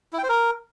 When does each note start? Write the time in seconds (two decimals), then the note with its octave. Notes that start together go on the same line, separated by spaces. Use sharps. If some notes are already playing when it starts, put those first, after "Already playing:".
0.13 E4
0.18 G5
0.24 C5
0.29 A#4